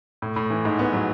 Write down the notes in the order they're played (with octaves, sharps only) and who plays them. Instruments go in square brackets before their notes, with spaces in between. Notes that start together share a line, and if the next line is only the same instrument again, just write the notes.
[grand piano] A2
A2
E3
G#2
B3
F#3